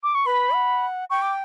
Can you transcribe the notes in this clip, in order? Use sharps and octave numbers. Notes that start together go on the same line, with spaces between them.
D6
C#6
B4 B5
F#5
G5 C#6
D6